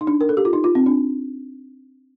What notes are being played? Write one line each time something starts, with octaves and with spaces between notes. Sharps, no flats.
D#4
D4
A#4
A4
G4
F4
D#4
F4
C4
D4